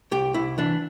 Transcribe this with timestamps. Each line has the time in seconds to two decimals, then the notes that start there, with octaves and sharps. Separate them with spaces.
0.11 C2 G4
0.34 C2 E4
0.58 E3 D4